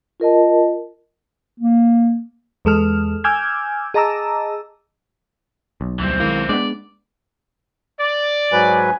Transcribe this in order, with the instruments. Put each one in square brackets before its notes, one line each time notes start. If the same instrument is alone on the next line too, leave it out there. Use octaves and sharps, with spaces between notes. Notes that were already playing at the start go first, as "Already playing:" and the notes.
[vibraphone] F4 A#4 D#5 A5
[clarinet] A#3
[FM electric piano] E2 G#3 A4 F6
G#5 D6 E6 F6 G6 G#6
G#4 D#5 A5 A#5 D6 E6
[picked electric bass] B1
[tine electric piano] D2 G3 [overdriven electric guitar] E3 C4
[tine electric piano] D#3 G#3 E4 [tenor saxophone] A#3
[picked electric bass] G#3 B3 [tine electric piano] D4 [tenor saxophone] D5
[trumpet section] D5
[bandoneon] G#2 F#3 B4 [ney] G#5